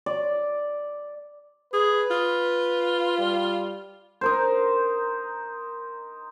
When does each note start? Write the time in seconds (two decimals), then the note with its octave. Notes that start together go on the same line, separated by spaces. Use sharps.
0.06 D5
1.73 G#4 B4
2.11 F4
3.19 G3
4.21 D#4 A#4 C5